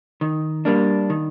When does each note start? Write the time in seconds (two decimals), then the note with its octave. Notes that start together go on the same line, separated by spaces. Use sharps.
0.21 D#3
0.65 G3 A#3 D4
1.10 D#3